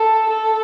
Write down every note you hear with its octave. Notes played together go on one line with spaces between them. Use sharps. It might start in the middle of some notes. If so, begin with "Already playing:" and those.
Already playing: A4
A4